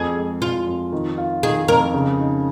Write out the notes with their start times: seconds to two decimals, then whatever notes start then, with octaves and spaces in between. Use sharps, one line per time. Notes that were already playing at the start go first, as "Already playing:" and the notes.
Already playing: F2 G#4
0.17 G#3
0.42 F2 F4
0.67 F2
0.92 D#3
1.18 F4
1.43 D#3 G#4
1.68 F2 A#4
1.94 C#3
2.19 D#4